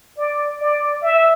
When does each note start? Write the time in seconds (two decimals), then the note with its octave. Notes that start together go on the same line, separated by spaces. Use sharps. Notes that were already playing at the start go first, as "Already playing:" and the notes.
0.18 D5
0.61 D5
1.03 E5